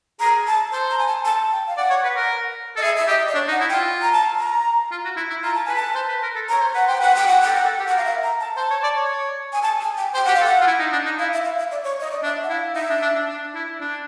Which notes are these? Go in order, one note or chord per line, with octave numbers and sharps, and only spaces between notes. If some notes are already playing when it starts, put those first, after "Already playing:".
G#4 A#5
A5
C5 A5
A#5
G#5
A5
A5
G5
F5
D5 F#5
C#5
B4
A#4
A4 D#5
G#4 E5
E5
G4 D#5
D5
D4 C#5
D#4
F#5
E4
G5
F4
A#5
A5
A#5
F4
F#4
E4
E4
F4 A#5
A5
B4 G#5
A5
C5
B4
A#4
A4
A#5
C#5
C5
B4 F#5
C5 G5
B4 F#5
G5
F#5
A4 G5
A#4 F#5
A4
G4
F#5
A#4
F5
E5
A#5
A5
C5 A5
C#5
D5
C#5
G#5
A5
G#5
G5
C5 G5
G4 F#5
F5
A4
F#5
F4
E4
D#4
D4
D#4
E4 F5
E5
F5
E5
D5
C#5
D#5
D5
D4 E5
F#5
E4 F5
D#4 E5
D4
D4
D4
D4
E4
D4